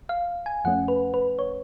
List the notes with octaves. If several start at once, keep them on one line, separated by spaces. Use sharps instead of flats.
F5
G#5
F2 F3 A3 C#4 F#5
B4
B4
C#5